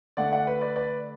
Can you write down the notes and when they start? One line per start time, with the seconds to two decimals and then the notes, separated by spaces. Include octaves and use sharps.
0.17 D3 A3 E4 D5 F#5
0.32 D5 F#5
0.47 B4
0.61 B4 D5
0.76 B4 D5